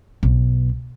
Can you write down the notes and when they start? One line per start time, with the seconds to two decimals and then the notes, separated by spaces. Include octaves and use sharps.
0.23 B1